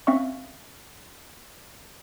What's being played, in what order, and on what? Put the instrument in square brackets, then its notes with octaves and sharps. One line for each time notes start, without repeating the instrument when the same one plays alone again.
[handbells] C4 C#4 E5 F5 C#6